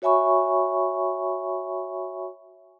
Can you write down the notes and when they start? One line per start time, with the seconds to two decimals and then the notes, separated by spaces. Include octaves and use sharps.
0.02 F#4 C#5 E5 G#5 B5 C#6